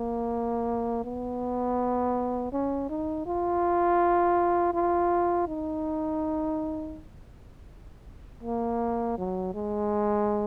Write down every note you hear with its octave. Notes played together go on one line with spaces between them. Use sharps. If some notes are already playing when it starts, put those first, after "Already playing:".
Already playing: A#3
B3
C#4
D#4
F4
F4
D#4
A#3
F#3
G#3